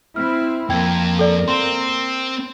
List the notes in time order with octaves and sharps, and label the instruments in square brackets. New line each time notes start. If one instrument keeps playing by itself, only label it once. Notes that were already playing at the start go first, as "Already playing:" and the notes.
[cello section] C4 E4 C5 [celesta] F6
[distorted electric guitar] F2 [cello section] A#3 A#4 [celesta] G5 G#6
[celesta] A4 D5
[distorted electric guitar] C4 [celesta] C6